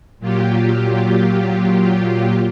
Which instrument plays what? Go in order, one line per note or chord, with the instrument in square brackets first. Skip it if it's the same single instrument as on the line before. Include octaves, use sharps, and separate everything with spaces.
[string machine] A#2 F#3 F4 G4